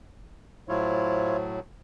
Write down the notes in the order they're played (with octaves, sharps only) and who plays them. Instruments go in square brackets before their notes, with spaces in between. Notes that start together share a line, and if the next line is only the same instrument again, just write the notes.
[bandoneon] A2 F#3 [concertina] E4 F4 C#5 [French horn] C5